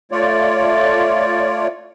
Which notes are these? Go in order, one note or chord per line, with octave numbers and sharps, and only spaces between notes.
A3 F4 C#5 D5